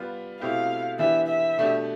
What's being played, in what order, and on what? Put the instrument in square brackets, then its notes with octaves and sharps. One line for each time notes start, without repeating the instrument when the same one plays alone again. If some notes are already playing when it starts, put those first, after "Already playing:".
Already playing: [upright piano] G3 B3 F4
[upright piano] B2 A3 C4 E4 G4 [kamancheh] F5
[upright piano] E3 B3 D4 G4 [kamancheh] E5
[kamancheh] E5
[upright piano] B2 A3 D4 G4